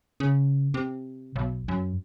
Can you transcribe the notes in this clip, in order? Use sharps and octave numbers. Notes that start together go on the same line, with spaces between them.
C#3
C3
B1
F#2